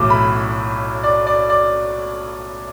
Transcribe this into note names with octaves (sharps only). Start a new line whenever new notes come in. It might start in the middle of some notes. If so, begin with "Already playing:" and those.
Already playing: B1 A2 E3 D6 E6
B5
D5
D5
D5